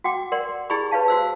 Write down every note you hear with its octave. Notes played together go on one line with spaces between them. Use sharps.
F#4 F#5 G5 D6
A#4 D5 F#5 C6
E4 G4 G#4 D5 B5 C#6
B4 C#5 F5 A5
F#4 C5 E6